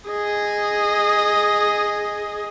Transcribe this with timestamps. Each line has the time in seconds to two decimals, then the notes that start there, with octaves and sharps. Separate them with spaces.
0.10 G#4 D#5